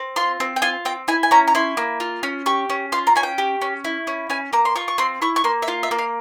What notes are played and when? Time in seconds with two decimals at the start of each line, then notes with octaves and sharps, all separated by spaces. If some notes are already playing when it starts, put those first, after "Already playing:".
Already playing: C4
0.16 F4 C6
0.40 C4
0.56 G5
0.62 F4 G#5
0.85 C4 G5
1.08 E4 G#5
1.23 G#5
1.31 C#4 A#5
1.48 A#5
1.55 E4 C6
1.77 A#3
2.00 F4
2.23 C#4
2.46 G4 C#6
2.70 C#4
2.92 F4 C6
3.07 A#5
3.16 C#4 G#5
3.23 G5
3.38 G4
3.62 C#4
3.84 E4
4.07 C#4
4.30 C#4 G#5
4.53 A#3 A#5
4.65 C6
4.76 F4 C#6
4.88 C#6
4.98 C4 C6
5.22 E4 C#6
5.36 C#6
5.44 A#3 C6
5.62 E5
5.68 F4 F5
5.83 E5
5.91 A#3
5.99 F5